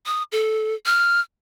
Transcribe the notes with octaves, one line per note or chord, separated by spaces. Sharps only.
D#6
A4
F6